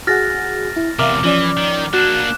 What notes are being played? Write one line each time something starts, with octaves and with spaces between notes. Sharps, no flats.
F#4 G#4 F#5 F6 A6 A#6
E4
E2 C3 A#4 E5 F5 D6 F6
E3 F3 C#4 D5
D#3
A#3 D4 F#4 F#6 E7